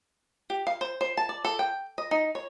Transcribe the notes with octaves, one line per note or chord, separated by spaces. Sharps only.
G4
F5
C5
C5
A5
D5
A4
G5
D#5
D#4
C#5